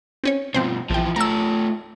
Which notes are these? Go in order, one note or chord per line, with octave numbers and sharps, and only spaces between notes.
C4 C#4 C#5
G2 B2 F3 C4 C5
A#1 E3 F3 G5
A3 F4 A#5 E6